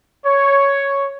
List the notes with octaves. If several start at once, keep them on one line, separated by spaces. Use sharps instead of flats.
C#5